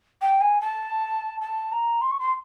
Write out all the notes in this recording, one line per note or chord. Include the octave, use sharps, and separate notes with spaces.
G5
G#5
A5
A5
A#5
C6
C#6
C6